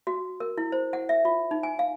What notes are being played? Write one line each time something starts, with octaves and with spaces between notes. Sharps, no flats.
F#4
A#4
E4
C5
F#5
E5
F4
D#4
G#5
F5